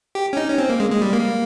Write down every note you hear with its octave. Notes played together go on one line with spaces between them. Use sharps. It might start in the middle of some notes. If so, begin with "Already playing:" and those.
G4
C#4
D#4
C#4
C4
A#3
G#3
G#3
G3
A#3